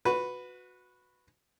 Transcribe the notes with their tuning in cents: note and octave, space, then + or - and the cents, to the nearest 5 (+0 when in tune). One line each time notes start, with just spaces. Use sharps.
F#4 -15 B4 +5